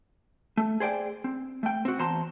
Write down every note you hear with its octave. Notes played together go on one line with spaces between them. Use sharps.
A3
G#4 C5 D5 G5
C4
A3 G5
C4 F#4
E2 C5 A5 A#5 C6